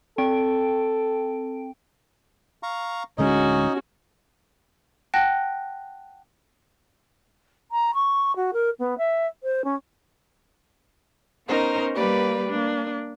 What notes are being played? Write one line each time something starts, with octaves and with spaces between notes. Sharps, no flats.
C4 A4 G5 D7
F5 A#5 C#6
D1 D3 G#3 C#4 D#4 F#4 D#5
F#5 G5 A5 F#6 A#6
A#5
C#6
F#4
A#4
B3
E5
C5
C#4
B3 C#4 D#4 A#4 C5
G3 A#3 G4 B4 D5
A#3 D4